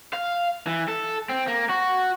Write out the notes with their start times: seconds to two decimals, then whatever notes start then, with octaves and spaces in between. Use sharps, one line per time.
0.13 F5
0.67 E3
0.88 A4
1.29 C4
1.47 A#3
1.69 F#4